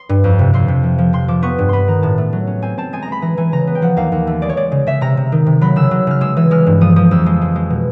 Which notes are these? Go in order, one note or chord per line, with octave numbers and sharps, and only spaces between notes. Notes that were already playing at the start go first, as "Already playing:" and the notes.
Already playing: C6
G2
F2
C3
F2 C6
C3
F3
F3
C3 C6
F3 D6
B3 C#6
G2
B3 B5 C6
D#3 A#5
A2 A5
A3
F#3
C#4
C4 G#5
C4 A5
G#3 G#5
A#5
G#3 B5
E3 A#5
E3 G#5
C#3 A#5
B3
G5
F3 F#5
D#2 F5
D#2
A3
G#3 D5
C#5
G#3 D5
C#3
C#3 E5
C3 A#5
C3
D#3
C3
F#3 B5
C#3 E6
F#3
C#3 F6
G#3 E6
E3 E6
G#3 F6
G2
F3 D#6
F3 D#6
F2 E6
G#3
G#3
G#3
B2